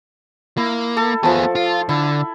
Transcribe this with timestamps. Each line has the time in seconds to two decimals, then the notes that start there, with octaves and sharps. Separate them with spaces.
0.57 A#3 E4
0.97 A4
1.23 F3 A3 B3 G#4
1.55 F4
1.89 D3 E4